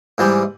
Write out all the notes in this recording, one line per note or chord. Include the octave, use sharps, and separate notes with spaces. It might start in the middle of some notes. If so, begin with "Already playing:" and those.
G#2 E3 G3